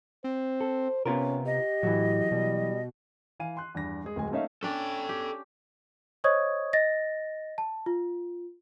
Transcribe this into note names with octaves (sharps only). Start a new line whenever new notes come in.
C4 C5
A4
C3 B3 C#4 F4 A#4
G4 D#5
A2 E3 F#3
B2 G3
E3 F5 G#5 D#7
C6 F#6
E2 G2 A#6
G#3 G#4
D1 G#3 G#5
A3 A#3 C#4 D#4 E5 F5
C#4 D4 A4 D5 G5
G4
C5 C#5 D#5 C#6 D#6 G#6
D#5 A6 A#6
A5
F4